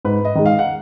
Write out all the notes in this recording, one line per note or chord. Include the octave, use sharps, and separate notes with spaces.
G#2 B4
D#5
D#3 G#3
F5
F#5